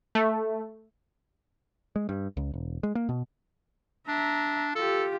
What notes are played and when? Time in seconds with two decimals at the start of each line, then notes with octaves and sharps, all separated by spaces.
0.15 A3
1.96 G#3
2.09 G2
2.37 C#2
2.54 E1
2.83 G#3
2.95 A#3
3.09 B2
4.08 D4 E5 A#5
4.75 F4 G4 A4